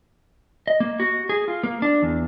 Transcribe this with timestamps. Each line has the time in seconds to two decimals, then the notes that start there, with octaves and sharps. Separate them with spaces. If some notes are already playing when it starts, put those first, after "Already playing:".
0.67 D#5
0.80 A#3
1.00 F#4
1.29 G#4
1.48 F4
1.63 A#3
1.82 D4
2.02 E2